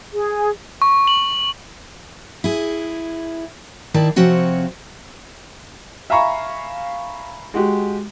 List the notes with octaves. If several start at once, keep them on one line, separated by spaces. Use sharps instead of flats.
G#4
C#6
F#7
E4 G#4
D#3 E4 D5 A5
C3 F3 C4 F#4 C#5
E5 F5 G#5 A#5 B5 C#6
G#3 F#4 G4